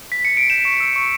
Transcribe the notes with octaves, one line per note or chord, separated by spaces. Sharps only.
B6
C#7
D7
G6 E7
C#6
E6
C#6